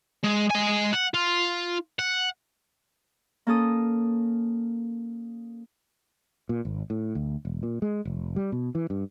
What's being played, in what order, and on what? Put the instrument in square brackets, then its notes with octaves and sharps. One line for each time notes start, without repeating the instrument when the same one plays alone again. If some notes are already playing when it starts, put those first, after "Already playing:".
[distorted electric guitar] G#3
G#3 G#5
F#5
F4
F#5
[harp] A#3 C#4 A4 D#6
[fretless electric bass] A#2
G#1
A2
D2
E1
A#2
G#3
F1
G3
B2
E3
G2